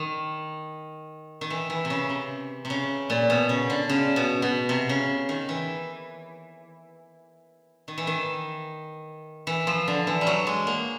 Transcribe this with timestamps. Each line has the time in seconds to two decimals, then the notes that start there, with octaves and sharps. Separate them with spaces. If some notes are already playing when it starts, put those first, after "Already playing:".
Already playing: D#3
1.41 D#3
1.50 E3
1.70 E3
1.85 C3
1.90 C#3
2.09 C3
2.65 C3
2.70 C#3
3.10 A#2
3.30 B2
3.49 C#3
3.70 D3
3.89 C#3
4.16 B2
4.42 B2
4.69 C3
4.89 C#3
5.29 D#3
5.49 E3
7.88 D#3
7.98 E3
8.07 D#3
9.47 E3
9.67 F3
9.87 D3
10.07 E3
10.21 G3
10.27 F#3
10.47 G#3
10.67 A#3